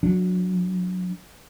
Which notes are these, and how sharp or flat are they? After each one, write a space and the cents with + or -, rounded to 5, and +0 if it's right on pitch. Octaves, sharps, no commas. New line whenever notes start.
F#3 -25 D4 +0